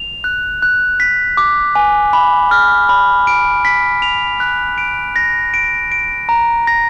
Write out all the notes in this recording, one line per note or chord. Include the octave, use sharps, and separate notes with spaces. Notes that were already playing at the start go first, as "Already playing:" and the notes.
Already playing: F7
F#6
F#6
B6
D6
G#5
B5
F6
B5
D7
B6
F7
F#6
D7
A#6
D7
D7
A#5
A#6